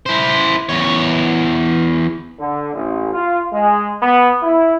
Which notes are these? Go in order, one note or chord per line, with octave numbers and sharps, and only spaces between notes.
E4 C5
E2 C#5
D3
A1
F4
G#3
B3
E4